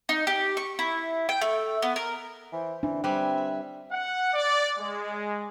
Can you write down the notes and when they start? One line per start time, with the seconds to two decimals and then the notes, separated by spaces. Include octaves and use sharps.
0.09 D#4
0.27 G4
0.57 C#6
0.79 E4
1.29 G5
1.41 A3
1.82 B3
1.96 A#4
2.52 E3 C5
2.83 E3 D4
3.04 G3 C4 B4 E5 G#5
3.92 F#5
4.34 D5
4.79 G#3